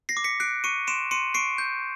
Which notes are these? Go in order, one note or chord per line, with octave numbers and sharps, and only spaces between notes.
A#6 C7
D6
B6 C#7
F#6 C7 D7
C#6 C#7 D#7
C6 D7 E7
C6 C#7 D#7
C#6 C7 D7
G6